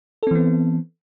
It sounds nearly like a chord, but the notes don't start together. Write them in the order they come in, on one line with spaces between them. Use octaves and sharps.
A4 C4 E3 B3